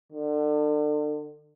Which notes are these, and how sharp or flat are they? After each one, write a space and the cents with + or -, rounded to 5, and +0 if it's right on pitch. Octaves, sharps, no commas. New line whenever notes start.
D3 +35